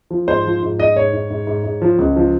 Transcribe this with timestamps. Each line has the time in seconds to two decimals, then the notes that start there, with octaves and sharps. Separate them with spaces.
0.10 F3
0.28 G#2 C5
0.46 F3
0.62 G#2
0.79 G#2 D#5
0.96 G#2 C#5
1.13 G#2
1.30 G#2
1.47 G#2
1.64 G#2
1.82 F3
1.98 C#2
2.16 F3